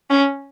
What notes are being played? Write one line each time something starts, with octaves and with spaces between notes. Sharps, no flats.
C#4